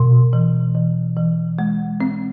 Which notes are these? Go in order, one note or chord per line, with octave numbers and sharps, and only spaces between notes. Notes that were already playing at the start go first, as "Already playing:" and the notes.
Already playing: B2
E3
E3
E3
G#3
C4